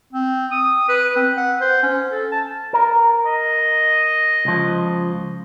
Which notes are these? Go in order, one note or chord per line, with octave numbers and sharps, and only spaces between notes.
C4
D#6
B4
C4
F#5
C5
C#4
A4
A5
A#4
D#5
C#2 F3